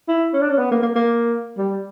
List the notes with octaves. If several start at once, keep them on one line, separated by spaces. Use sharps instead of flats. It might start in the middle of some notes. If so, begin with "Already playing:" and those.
E4
C#4
D4
C#4
B3
A#3
A#3
A#3
G3